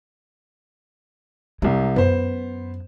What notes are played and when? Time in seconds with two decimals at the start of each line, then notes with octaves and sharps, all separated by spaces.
1.62 C2 C3 G#3
1.96 F#2 B3 C5